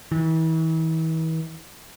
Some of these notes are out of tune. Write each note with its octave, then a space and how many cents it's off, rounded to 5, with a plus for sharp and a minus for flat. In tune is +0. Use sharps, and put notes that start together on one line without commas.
E3 -40